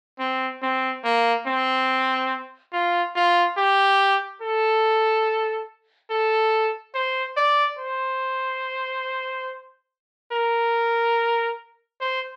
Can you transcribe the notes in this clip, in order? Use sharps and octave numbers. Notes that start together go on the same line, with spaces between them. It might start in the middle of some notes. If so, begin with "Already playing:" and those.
C4
C4
A#3
C4
F4
F4
G4
A4
A4
C5
D5
C5
A#4
C5